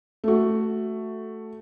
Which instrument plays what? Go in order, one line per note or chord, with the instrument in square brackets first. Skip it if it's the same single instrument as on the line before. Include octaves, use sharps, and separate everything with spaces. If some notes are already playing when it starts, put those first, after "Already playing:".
[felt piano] A3 F#4